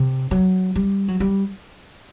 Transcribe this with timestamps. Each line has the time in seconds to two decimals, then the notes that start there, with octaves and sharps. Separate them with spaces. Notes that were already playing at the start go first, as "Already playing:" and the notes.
Already playing: C3
0.31 F#3
0.75 G3
1.08 F#3
1.20 G3